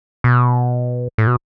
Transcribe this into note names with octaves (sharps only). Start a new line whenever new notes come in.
B2
A2
B2